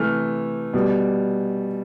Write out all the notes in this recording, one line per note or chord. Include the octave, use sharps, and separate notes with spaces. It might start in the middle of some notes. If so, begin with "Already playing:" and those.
Already playing: C3 E3 A3 F6
B2 G3